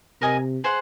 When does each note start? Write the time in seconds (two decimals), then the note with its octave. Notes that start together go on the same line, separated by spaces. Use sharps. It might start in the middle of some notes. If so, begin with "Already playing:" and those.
0.21 C3 A#4 D#5 G#5 D#6
0.64 G#4 C5 F#5